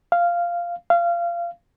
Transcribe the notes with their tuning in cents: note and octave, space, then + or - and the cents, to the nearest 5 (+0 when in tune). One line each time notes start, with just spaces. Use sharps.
F5 -10
F5 -25